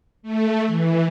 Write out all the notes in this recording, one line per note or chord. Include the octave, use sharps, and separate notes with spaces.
A3
E3